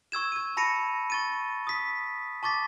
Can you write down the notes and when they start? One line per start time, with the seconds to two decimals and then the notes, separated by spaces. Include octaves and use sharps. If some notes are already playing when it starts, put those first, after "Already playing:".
0.12 C#6 E6 G#6 E7
0.32 G#6 D#7
0.57 A5 B5 A#6 C#7 D#7
1.10 C#6 A6 D#7
1.67 D#6 B6
2.43 A5 C#6 D6 A6 B6